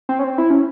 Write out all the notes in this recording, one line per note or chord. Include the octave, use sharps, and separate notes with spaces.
C4
C#4
C4
E4
C#4